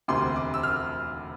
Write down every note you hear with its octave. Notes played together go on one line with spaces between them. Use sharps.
E1 D2 C3 C6
D6
E6
F6